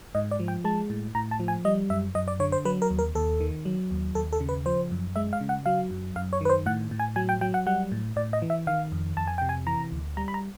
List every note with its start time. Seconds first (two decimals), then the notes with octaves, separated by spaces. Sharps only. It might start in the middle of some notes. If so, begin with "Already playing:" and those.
0.15 G#2 D#5
0.31 D5
0.40 F3
0.48 G5
0.64 G#3 A5
0.90 A2
1.15 A2 A#5
1.31 A5
1.40 F3
1.48 G#5
1.65 G3 D#5
1.90 F#2 E5
2.15 F#2 D#5
2.28 D5
2.40 D3 C#5
2.52 C5
2.65 F#3 B4
2.82 A#4
2.90 D#2
2.99 A#4
3.15 D#2 A4
3.40 D#3
3.65 F#3
3.91 D#2
4.15 D#2 A4
4.33 A4
4.41 C#3
4.49 B4
4.66 F3 C5
4.91 F#2
5.16 G#3 E5
5.33 F5
5.41 C#3
5.49 F#5
5.66 F#3 F5
5.91 F#2
6.16 F#2 F5
6.33 C#5
6.41 D#3 B4
6.49 C5
6.66 A2 F#5
6.91 A2
6.99 G#5
7.16 F#3 G#5
7.29 G5
7.41 F#3 G5
7.54 F#5
7.66 G3 F#5
7.92 A2
8.16 A2 D5
8.33 D#5
8.42 E3
8.50 E5
8.67 D#3 F5
8.92 F2
9.17 F2 A5
9.27 G#5
9.38 C3 G5
9.49 G#5
9.67 E3 A#5
9.92 D2
10.17 G3 A#5
10.28 B5
10.34 A#5